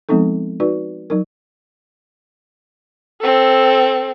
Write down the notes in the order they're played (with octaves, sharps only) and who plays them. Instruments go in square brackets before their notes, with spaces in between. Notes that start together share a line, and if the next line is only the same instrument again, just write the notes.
[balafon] F3 G#3 B3 C4 D#4 A4
D#4 F#4 B4 D5
F#3 D#4 A#4
[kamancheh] C4 A4